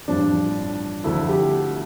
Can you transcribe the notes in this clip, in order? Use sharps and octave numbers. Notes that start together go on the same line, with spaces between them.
A1 G2 F3 D4
D2 D3 F3 E4
G4